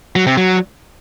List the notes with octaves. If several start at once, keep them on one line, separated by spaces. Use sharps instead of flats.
F#3
C3
F#3